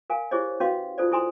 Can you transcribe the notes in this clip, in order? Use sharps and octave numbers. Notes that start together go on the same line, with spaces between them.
A#4 F5 G#5
E4 G4 G#4 C5 C#5 D#5
C#4 F#4 B4 D#5 F5 C6
D#4 F4 A4 C5 D5
E4 A4 G#5 A#5 C6